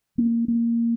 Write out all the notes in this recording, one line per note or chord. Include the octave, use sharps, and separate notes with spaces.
A#3
A#3